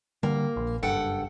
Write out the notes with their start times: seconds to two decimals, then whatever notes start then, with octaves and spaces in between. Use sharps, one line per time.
0.23 D3 G3 A#3
0.56 A#1
0.83 F#1 G2 A4 F#5 G5